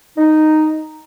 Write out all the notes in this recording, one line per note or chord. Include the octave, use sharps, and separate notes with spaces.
D#4